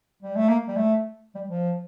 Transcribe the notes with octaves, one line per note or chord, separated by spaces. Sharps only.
G3
A3
A#3
G3
A3
G3
F3